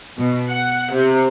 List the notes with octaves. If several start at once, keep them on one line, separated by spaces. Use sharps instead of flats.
B2
F#5
C3